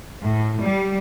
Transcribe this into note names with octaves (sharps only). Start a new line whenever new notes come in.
A2
G3